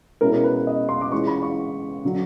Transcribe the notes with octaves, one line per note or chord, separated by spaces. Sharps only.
B2 G#3 C#4 E4 A#4
A#4
B4
D#5
C6
D6
E3 G#3 C#4 F4 C#6
B5
C#6
D3 F#3